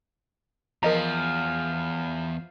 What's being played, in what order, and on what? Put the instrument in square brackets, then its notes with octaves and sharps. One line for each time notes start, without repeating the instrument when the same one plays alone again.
[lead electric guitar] E2 [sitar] F3 [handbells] A#4 D#5 A#5